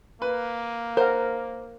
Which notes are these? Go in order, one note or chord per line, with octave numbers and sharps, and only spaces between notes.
A#3 B4
A#4 C5 F#5